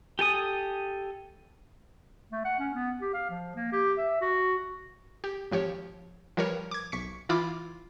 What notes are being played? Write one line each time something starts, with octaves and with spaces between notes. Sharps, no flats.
G4 A4 G#5 D#6
A3
F#5
C#4
B3
G4
F5
F3
A#3
G4
E5
F#4
G4
G#1 F3 G4 C#5
F3 G3 A#4 B4 C#5
D6 G#6
B1 C#6 B6 C#7
E3 E4 F4 B5 D6